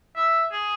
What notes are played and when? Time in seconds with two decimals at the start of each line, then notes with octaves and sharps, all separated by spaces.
0.16 E5
0.52 G#4